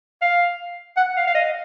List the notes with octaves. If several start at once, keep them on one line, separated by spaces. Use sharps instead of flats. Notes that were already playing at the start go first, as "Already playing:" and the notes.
F5
F#5
F5
F5
D#5